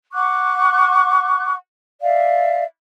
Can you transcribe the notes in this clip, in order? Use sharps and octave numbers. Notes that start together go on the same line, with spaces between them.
F#5 C#6 D6 F#6
D5 E5 F5